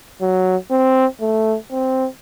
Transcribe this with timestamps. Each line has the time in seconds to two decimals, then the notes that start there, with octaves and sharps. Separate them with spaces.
0.22 F#3
0.71 C4
1.21 A3
1.72 C4